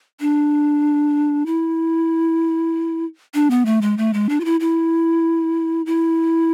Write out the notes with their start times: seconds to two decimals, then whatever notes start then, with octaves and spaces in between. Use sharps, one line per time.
0.20 D4
1.46 E4
3.34 D4
3.50 B3
3.66 A3
3.82 G#3
3.97 A3
4.13 G#3
4.29 D4
4.40 F4
4.45 E4
4.60 E4
5.86 E4